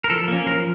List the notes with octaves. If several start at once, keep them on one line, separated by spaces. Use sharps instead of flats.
A#4
F3 A4
A#3 C#4
F3 A#4